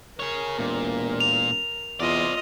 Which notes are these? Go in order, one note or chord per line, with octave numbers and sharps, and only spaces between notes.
G#4 A#4 C#5
E1 A#2
F7
E2 C4 F4 D5 D#5